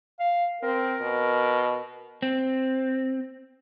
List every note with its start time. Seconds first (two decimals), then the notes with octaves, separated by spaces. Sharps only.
0.20 F5
0.63 C4 A#4
1.01 B2
2.22 C4